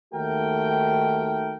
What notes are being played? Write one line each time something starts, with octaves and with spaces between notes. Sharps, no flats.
D#2 D#3 A3 F#4 A#4 G5